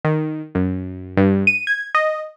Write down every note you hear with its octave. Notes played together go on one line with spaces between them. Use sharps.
D#3
F#2
G2
D#7
G#6
D#5